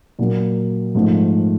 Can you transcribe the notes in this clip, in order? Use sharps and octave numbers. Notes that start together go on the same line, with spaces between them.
A#2 F#3 A#3
G#2 F3 A3